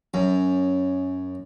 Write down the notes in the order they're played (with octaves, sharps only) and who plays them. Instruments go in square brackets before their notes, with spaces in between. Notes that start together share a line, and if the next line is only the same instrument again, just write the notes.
[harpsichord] F#2